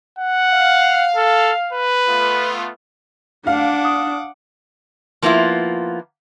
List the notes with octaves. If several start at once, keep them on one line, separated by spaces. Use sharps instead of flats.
F#5
F5
A4
B4
A3 B3 F4
D4 F5 F#5 D6
D#6
F3 A#3 B3 E4 F4